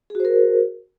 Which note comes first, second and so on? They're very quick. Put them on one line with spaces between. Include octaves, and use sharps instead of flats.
G#4 F#4 C5 A#4